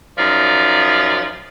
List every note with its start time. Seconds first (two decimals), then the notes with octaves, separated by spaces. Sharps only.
0.18 F#2 F3 D#4 D5